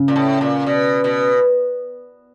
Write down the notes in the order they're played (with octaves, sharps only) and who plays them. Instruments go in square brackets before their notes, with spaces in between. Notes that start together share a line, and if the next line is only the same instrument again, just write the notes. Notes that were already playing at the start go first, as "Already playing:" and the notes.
Already playing: [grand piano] C#3
[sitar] A#2
A2
A#2
B2
B2